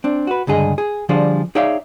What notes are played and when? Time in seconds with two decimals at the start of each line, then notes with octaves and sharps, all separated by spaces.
0.04 C4 D4
0.27 F#4 B4
0.47 C#2 G2 D3 G#4 D#5
0.78 G#4
1.09 D3 F3 G3 D4 G#4 C5
1.55 D#4 G#4 C#5 D5 E5 F5